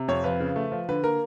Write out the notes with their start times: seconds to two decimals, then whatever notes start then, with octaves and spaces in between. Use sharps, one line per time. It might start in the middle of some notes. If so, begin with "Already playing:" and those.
Already playing: C3
0.08 F2 C#5
0.24 F3 B4
0.40 C#3
0.56 A3
0.72 F3
0.89 D3 B4
1.04 A#3 A#4